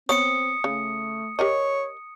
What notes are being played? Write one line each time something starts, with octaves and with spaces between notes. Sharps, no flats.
B3 C4 C#5 D#6 C#7
C#3 A3
G4 A#4 C#5 D#5